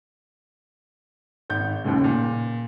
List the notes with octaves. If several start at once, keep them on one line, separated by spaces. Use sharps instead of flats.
G#1 G6
F#1 D#2 A2 C#3
A#2